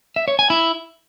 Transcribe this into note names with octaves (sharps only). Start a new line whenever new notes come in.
E5
C#5
G#5
E4